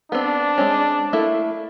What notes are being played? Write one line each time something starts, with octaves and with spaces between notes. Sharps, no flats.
B3 C4 D4
G#3 C4 C#4
A3 A#3 E4